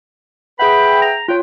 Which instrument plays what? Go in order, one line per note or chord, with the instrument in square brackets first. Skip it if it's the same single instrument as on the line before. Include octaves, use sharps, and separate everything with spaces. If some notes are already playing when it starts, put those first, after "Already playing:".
[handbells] G#4 F#5 [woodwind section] B4 E5 G5 [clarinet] B5
[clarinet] A#5
[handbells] F4 C#5 [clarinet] G5